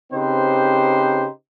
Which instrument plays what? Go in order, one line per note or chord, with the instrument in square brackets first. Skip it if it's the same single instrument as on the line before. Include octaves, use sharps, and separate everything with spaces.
[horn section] C#3 C4 D#4 G4 B4 C5